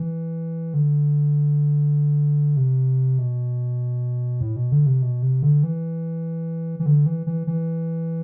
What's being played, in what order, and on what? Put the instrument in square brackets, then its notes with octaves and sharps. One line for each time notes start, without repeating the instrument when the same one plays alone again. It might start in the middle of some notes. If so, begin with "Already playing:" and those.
Already playing: [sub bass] E3
D3
C3
B2
A2
B2
D3
C3
B2
C3
D3
E3
E3
D3
E3
E3
E3